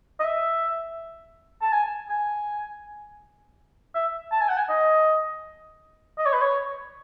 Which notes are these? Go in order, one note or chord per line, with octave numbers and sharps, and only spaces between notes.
D#5
E5
A5
G#5
G#5
E5
A5
G#5
F#5
G#5
D#5
D#5
C#5
B4
C#5